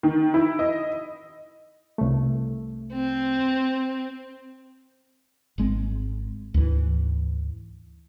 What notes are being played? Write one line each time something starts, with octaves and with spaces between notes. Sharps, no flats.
D#3
E4
D#5
C2 A3
C4
G#1 G#3 C4
D2 G#2 E3